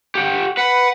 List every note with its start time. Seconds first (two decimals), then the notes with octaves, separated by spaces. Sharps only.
0.15 G4 F#5
0.57 B4 F#5